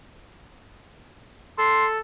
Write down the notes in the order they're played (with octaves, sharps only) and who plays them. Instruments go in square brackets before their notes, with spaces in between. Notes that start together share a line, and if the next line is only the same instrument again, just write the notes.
[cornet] A4 [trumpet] C6